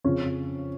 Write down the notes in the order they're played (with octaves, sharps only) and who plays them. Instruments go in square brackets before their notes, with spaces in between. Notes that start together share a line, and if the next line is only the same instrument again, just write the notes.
[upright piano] F2 C#3 F3 C#4